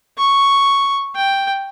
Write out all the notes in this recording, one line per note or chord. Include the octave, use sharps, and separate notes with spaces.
C#6
G5